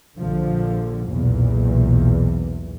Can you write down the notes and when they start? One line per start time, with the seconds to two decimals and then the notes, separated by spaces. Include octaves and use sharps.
0.18 A#1 D3 F3
1.08 B1 E2 A#2